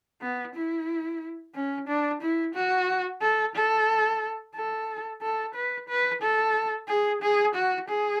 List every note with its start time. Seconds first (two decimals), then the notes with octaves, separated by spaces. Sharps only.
0.21 B3
0.55 E4
1.55 C#4
1.88 D4
2.22 E4
2.55 F#4
3.21 A4
3.56 A4
4.55 A4
5.22 A4
5.55 B4
5.89 B4
6.22 A4
6.88 G#4
7.22 G#4
7.55 F#4
7.88 G#4